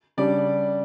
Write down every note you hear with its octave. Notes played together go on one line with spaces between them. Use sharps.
C#3 G3 D4 D5